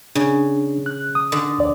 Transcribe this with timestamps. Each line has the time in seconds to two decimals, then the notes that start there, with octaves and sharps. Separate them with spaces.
0.15 C#3 D4
0.86 F#6
1.15 D#6
1.32 D3
1.59 D2 D5